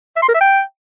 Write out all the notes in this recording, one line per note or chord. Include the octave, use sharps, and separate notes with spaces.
E5
C6
A#4
E5
G5